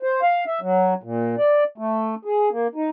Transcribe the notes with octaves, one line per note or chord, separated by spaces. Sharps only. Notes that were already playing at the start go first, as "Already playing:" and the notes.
C5
F5
E5
F#3
A#2
D5
A3
G#4
A#3
D#4